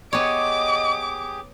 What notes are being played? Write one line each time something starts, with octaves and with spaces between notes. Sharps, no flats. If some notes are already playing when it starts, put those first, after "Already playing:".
B3 G4 G#4 C#5 D#5 D6